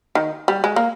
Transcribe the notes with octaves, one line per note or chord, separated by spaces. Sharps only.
D#3
G3
G#3
A#3